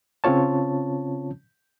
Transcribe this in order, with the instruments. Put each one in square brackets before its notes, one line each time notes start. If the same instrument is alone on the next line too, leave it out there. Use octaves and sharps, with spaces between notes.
[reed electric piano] C#3 C4 C#4 F4 C#5 A5